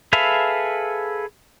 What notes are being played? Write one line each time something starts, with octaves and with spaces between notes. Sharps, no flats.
G#4 A4 B4 E5 F5